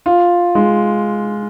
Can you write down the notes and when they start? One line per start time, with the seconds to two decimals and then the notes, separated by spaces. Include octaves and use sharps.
0.06 F4
0.55 G#3